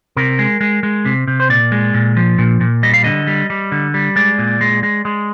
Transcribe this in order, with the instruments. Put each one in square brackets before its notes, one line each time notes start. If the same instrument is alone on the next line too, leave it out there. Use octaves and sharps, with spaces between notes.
[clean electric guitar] C3 A#4
G#3
G#3
G#3
C3
C3
C5
A#2 D5
G#3
A#2
F3
A#2
A#2
G3 D#5
F5
D3 D#5
G3
G3
D3
G3
G#3 D5
A#2
G#3
G#3
G#3